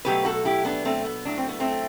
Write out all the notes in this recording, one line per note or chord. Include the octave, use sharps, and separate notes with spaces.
B2 F#3 A3 G4 B4
F#4 A4
E4 G4
B3 D4
A3 C4
B3
A2 F#3 A3 D4
C4
B3
A3 C4